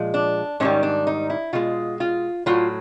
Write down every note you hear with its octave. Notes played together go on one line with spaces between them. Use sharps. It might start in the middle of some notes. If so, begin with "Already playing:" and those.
Already playing: A#2 F3 G#3
D4
G#2 D#3 G3 C#4
D4
D#4
E4
B2 G#3 F4
F4
A2 F#3 F4